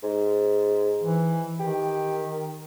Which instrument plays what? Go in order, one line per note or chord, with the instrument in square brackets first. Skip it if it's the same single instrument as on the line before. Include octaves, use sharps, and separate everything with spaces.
[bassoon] G#2
[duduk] E3
[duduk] D#3 [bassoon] G4